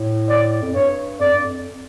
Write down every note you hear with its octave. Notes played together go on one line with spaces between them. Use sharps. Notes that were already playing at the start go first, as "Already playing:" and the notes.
Already playing: A2
D5
F2
G2 C#5
F2 D5
G2
F2